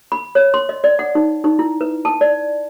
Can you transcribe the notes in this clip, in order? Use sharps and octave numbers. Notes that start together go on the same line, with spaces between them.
B5
C#5
C6
D#5
D5
F#5
D#4
D#4
E4
B4
A5
D5